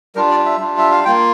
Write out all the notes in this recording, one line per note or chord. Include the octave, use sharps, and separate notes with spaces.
G3 D4 F4 A#4
D5
E5
G3 D4 F4
E5
F5
A#3 F4 G5